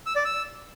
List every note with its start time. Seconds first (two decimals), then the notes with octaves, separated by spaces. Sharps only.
0.06 E6
0.16 D5
0.25 E6